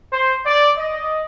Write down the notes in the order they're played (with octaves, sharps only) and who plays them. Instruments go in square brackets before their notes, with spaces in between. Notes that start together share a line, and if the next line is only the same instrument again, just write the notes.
[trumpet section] C5
D5
D#5